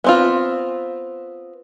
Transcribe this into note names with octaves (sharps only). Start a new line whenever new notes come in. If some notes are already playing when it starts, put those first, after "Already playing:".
B3 C4 F4